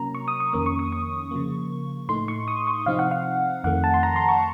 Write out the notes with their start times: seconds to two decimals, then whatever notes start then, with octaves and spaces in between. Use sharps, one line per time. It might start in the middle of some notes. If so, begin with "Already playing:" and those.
Already playing: C3 F#3 A#3 C#4 A#5
0.15 C#6
0.28 D#6
0.40 C#6
0.53 F2 D#3 A#3 C#4 D#6
0.66 C#6
0.79 D#6
0.92 C#6
1.31 C#3 F3 A#3
2.09 A2 A3 D#4 C6
2.28 C#6
2.48 D#6
2.67 C#6
2.86 C3 F3 C4 D#4 F5
2.99 F#5
3.11 F5
3.64 F2 D#3 A3 F#5
3.84 A5
3.94 C6
4.03 A#5
4.16 C6
4.29 C#6